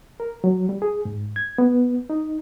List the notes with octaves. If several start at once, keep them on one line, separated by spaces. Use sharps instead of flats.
A#4
F#3
G3
G#4
G#2
G#6
B3
D#4